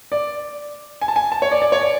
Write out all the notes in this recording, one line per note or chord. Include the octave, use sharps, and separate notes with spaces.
D5
G#5
A5
G#5
A5
C#5
D5
D5
C#5
D5